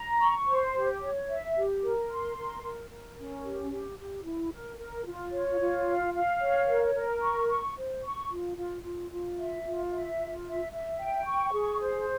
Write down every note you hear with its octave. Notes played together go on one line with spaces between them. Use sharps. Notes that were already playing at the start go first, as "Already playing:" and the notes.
Already playing: A#5
C#6
C5
G4
C#5
E5
G4
A#4
C6
A#4
A#4
A#4
C#4
G4
G4
G4
E4
A#4
A#4
F4
C#5
F4
F5
F5
C#5
A#4
A#4
C#6
C#6
C5
C#6
F4
F4
F4
F4
E5
F4
E5
F4
E5
E5
G5
C#6
G#4
C5